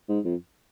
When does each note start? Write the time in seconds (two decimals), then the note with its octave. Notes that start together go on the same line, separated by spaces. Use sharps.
0.08 G#2
0.24 F2